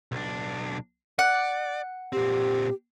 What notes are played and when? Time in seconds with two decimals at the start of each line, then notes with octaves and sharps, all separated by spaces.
0.12 B1 D4
1.19 D5 F#5
2.13 A#2 C4 G4